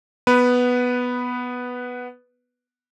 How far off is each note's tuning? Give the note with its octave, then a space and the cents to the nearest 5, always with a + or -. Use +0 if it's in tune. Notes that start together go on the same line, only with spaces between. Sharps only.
B3 +0 B4 +0